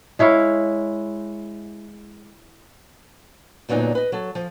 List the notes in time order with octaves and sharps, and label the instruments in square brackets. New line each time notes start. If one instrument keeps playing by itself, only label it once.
[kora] G#3 E4 C#5 F5
[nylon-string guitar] D2 A#2 F#3 B3 D#4 G#5
B4 D#5
F#3 A4
F3